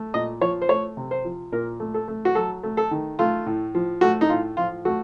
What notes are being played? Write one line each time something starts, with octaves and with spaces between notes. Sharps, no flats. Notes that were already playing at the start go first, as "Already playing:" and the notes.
Already playing: A3
A#2 D#5
F3 C#5
C5
A3 C#5
C3
C5
F3
A#2 A#4
A3
A4
A3
F#4
F#3 A4
A3
A4
D#3
A3 F4
A2
F3
A3 F#4
D#4
A2 F4
F3 F4
A3 F#4